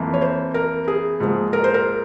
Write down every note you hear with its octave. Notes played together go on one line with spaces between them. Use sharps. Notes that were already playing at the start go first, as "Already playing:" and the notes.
Already playing: F2 E3 A#3
C#5
C5
A#4
G#4
G#2 F3 A#3
A#4
C5
A#4